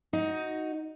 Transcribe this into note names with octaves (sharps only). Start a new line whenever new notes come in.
D#4 F#4